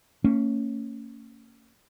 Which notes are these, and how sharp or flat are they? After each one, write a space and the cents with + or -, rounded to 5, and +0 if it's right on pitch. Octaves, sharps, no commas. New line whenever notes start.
A#3 -45 C#4 +0